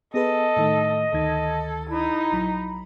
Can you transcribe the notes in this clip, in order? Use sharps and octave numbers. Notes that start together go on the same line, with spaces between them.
B3 G#4 A4 B4 D#5
A2 D#3 A3
D2 D#3 A4 G#6
D#4 E4
A#1 F#3 B5